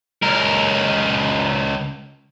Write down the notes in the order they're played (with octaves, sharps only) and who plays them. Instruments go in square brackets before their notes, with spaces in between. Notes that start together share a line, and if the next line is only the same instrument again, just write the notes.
[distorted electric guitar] C#2 A#4